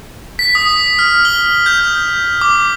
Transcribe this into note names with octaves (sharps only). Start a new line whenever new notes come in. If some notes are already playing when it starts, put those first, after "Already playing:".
B6
D#6
F6
G7
G6
D6